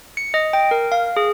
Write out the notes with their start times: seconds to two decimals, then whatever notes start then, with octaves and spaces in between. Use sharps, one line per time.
0.17 C#7
0.34 D#5
0.53 G5
0.71 A#4
0.92 F5
1.17 G#4